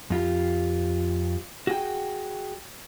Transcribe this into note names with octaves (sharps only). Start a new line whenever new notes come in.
F2 F4 G4
F#4 G#4 G5